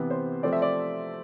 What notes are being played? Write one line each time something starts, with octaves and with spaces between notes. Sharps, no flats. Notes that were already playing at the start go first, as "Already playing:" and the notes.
Already playing: C3 E3 B3
C5
C3 F3 A3 C4 D5
E5
D5